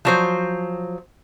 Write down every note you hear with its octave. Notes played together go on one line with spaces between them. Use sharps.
F3 F#3 C5